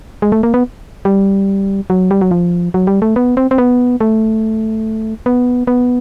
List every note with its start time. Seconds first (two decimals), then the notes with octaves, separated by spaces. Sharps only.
0.22 G#3
0.32 A3
0.43 A#3
0.54 B3
1.05 G3
1.90 F#3
2.11 G3
2.21 F#3
2.31 F3
2.74 F#3
2.87 G3
3.02 A3
3.16 B3
3.37 C4
3.51 C4
3.58 B3
4.01 A3
5.26 B3
5.67 B3